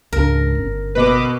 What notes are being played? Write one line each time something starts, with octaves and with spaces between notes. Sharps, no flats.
C#2 G#2 D4 A#4
G1 C#4
B2 B4 D#5 D6